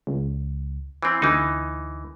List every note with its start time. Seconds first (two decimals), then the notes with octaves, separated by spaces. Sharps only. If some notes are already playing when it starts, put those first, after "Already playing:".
0.07 C#2
1.03 E3 C4
1.22 D2 E3 D#4